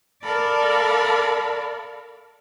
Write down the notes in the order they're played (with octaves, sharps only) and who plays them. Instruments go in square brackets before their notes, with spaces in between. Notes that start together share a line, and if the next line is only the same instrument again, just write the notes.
[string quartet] A4 A#4 D5 F5 A5 B5